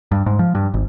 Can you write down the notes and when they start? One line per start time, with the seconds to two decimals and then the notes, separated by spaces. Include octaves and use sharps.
0.12 G2
0.26 G#2
0.39 F3
0.55 G2
0.74 G#1